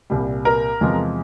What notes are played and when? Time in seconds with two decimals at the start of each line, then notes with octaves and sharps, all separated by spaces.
0.10 C2 A#2 G3
0.45 A#4
0.81 E2 C3 F3 G#3